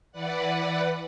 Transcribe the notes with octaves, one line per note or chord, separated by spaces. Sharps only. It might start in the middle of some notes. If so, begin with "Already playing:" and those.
E3 B4 D5 F#5